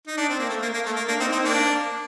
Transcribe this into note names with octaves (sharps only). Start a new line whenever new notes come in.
D#4
D4
C4
A#3
A3
A#3
A#3
A3
A#3
A#3 D4
C4 D#4
C4 D#4
A#3 D4